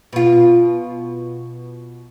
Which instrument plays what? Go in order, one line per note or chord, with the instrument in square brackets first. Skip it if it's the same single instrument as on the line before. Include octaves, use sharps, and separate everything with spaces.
[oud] B2 F4